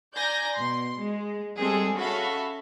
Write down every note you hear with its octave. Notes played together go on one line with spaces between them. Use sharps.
D5 G#5 A#5 G6 A#6
B2 C6
G#3
G3 G#3 C4 G#4 A4
C#4 F#4 A4 E5 F5 B5